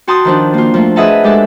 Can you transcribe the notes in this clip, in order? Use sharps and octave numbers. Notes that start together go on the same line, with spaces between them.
F#4 G5 A5 C6 D#6
D#3 F3 D4
A#3 F4
F3 A3
G#4 B4 D#5 E5 F#5 A5
G#3 D4 G4 A4 E5